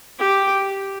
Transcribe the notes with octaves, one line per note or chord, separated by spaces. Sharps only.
G4